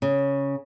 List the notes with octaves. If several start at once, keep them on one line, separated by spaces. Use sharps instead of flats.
C#3